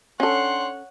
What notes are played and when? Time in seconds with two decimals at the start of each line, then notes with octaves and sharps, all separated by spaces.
0.20 C#4 D4 A4 C#5 F#5 G5 C6